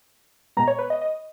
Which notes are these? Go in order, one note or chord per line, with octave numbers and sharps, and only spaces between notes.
A#2 G#3 B3 A#5
C#5
B4
D#5
D#5